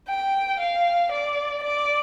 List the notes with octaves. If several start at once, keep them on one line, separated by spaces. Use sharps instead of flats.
G5
F5
D5
D5